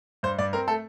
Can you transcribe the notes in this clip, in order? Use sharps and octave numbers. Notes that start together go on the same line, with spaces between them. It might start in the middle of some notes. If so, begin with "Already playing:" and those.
G2 C5
G2 D5
C4 A#4
A3 A4